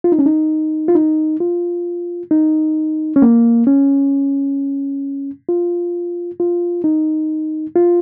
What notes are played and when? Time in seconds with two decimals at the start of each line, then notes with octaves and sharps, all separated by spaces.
0.04 F4
0.12 D#4
0.19 C#4
0.26 D#4
0.88 F4
0.95 D#4
1.40 F4
2.31 D#4
3.16 C#4
3.22 A#3
3.67 C#4
5.49 F4
6.40 F4
6.84 D#4
7.75 F4